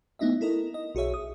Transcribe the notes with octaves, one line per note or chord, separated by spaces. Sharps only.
A3 B3 D#4 E4 D#5 E5
E4 A4 A#4 D#5
D#5
B1 F#4 G#4 C#5 E5
D#6